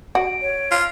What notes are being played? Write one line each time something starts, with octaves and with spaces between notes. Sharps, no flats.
F#4 D7
C#5
F4 F5